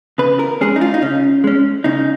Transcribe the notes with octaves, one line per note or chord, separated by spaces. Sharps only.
C#3 B4
A#4
G#3 C#4 G#4
D#4
F4
D#4
C#3 C#4
G#3 C#4
C#3 D#4